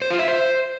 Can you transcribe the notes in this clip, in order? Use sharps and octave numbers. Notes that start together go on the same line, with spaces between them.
C5
F4
E5
C5